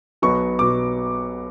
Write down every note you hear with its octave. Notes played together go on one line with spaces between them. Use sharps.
B1 B2 F#3 B3 C#6
B2 F#3 B3 D6